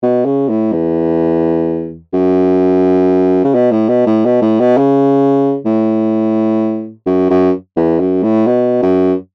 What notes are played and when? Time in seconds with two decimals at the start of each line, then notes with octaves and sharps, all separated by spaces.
0.03 B2
0.25 C#3
0.49 A2
0.73 E2
2.13 F#2
3.44 C#3
3.55 B2
3.72 A2
3.89 B2
4.07 A2
4.25 B2
4.42 A2
4.60 B2
4.77 C#3
5.65 A2
7.06 F#2
7.30 F#2
7.77 E2
8.00 F#2
8.23 A2
8.47 B2
8.82 F#2